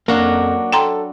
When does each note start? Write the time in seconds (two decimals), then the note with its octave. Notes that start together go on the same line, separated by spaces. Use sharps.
0.08 F2 F#3 A#3 D4 F#4
0.73 A4 G5 A#5 C6